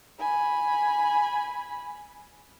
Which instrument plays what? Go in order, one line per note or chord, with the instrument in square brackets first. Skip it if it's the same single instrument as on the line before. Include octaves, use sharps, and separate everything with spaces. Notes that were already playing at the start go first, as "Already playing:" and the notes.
[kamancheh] G#5 B5